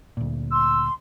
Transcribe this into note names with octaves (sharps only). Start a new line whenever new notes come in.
D2 A#2
C6 E6